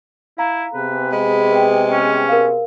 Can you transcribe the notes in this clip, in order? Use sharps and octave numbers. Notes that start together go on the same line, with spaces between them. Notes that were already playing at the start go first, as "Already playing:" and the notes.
E4 F5 A#5
C3 B3 G#4 B4
G#3 B5
B4 G5
C#4
A#4 F5